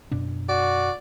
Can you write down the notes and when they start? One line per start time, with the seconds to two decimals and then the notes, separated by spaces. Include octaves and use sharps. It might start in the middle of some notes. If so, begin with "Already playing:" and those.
0.12 F#2 B2 D4
0.49 F#4 D5